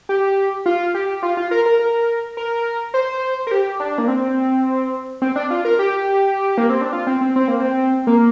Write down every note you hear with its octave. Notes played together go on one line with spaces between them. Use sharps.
G4
F4
G4
F4
F4
A#4
A#4
A#4
A#4
C5
A#4
G4
D4
A#3
C4
C4
D4
F4
A#4
G4
A#3
C4
D4
F4
C4
C4
C4
A#3
C4
A#3